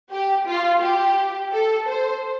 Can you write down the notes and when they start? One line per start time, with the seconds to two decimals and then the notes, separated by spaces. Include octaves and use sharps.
0.10 G4
0.46 F4
0.81 G4
1.52 A4
1.88 C5